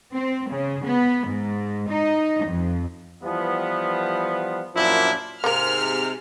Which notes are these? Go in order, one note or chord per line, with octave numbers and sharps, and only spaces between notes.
C4
C#3
B3
G#2
D#4
F2
E3 F3 G3 B3
F#2 A#2 F3 D4 E4
G#2 C3 A#3 A#4 F6